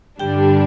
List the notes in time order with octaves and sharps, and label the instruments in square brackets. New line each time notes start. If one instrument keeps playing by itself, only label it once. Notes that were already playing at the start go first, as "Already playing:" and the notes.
[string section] G2 D3 G3 D4 [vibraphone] G4 G5